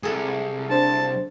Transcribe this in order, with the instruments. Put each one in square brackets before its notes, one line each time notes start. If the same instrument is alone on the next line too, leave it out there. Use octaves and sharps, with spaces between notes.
[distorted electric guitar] C2 [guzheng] G#4 A4
[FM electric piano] D4 C5 [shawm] A5